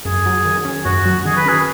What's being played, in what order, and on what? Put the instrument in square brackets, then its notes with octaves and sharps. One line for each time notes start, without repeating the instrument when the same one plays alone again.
[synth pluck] F#2 [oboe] G#4
[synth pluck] F#3
D#3
C#4
[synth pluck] F#2 [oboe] F#4
[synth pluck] F#3
[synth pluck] D#3 [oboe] G#4
[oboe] B4
[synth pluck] C#4 [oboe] G#4